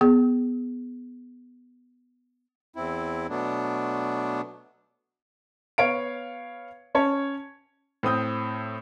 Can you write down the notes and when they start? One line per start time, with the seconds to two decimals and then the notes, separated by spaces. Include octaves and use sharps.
0.01 B3 G#4
2.76 E2 C4 E4
3.29 B2 F#3 A3 B3 D4
5.78 B3 C#5 F5 D7
6.95 C#4 C#5 A5
8.03 A2 C4 D#6 G6